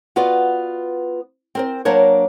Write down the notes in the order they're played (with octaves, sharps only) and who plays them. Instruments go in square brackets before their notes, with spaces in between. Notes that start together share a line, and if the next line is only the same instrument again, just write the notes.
[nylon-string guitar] B3 F4 F#4 B4 D5
C4 A#4 C5
F#3 A#3 D4 A#4 C5 C#5